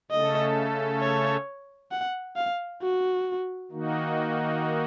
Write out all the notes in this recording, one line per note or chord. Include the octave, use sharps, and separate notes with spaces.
C#3 A3 C#4 A4 D#5
C#5
F#5
F5
F#4
D#3 A#3 D#4 F#4